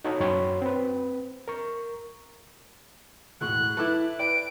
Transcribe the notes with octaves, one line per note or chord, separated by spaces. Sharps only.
D#4 F#4 A4 C#5 A5
F#2 F#4 C#5 G5 B5 C6
C4 B4
A#4 C#6
E1 A2 C#6 F#6
E4 A4 B4 E5 D6
B4 D5 G5 D7